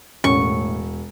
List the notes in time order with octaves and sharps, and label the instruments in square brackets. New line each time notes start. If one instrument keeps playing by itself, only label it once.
[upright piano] E1 [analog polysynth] A2 [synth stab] C#4 [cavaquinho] C#6